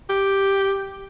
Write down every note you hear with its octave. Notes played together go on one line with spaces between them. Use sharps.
G4